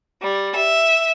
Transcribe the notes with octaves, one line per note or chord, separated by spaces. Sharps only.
G3
E5